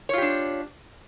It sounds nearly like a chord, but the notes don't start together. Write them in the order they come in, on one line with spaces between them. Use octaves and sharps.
C#5 F4 G4 D4